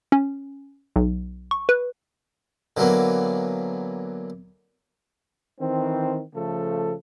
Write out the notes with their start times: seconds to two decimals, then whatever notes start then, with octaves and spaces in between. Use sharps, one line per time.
0.12 C#4
0.96 B1
1.51 C#6
1.69 B4
2.77 D3 E3 F#3 A#3 B3
5.59 D#3 E3 C4
6.34 C#3 F3 A3 A4